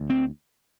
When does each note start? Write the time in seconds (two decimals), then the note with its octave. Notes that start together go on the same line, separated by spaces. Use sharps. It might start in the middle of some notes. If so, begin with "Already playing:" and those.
Already playing: D2
0.10 C4